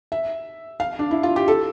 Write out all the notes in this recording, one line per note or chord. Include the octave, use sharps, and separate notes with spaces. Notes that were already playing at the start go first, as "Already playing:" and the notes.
E5
F5
D4
E4
F4
G4
A4